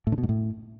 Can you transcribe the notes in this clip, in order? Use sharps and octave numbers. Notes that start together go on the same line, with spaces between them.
A2
D3
B2
G#2
A2